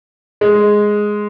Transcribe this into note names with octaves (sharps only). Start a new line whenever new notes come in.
G#3